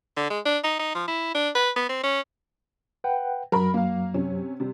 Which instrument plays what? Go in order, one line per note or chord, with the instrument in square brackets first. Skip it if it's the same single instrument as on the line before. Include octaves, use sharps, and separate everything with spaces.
[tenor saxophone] D3
G#3
D4
D#4
D#4
F3
E4
D4
B4
B3
C4
C#4
[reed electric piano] B4 F#5 G5
[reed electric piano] F#2 F#3 [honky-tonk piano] A#4 B5
[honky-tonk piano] A#3 F5
C3 C#4
C3 G3